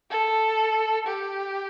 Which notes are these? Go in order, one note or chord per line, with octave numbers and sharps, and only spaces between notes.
A4
G4